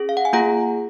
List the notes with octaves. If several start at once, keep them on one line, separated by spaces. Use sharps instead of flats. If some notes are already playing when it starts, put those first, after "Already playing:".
Already playing: C#4 G#4
F5
F#5
G#5
A#3 F4 G#4 F#5 A#5